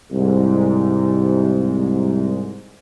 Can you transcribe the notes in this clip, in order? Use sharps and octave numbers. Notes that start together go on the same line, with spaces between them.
C2 G#2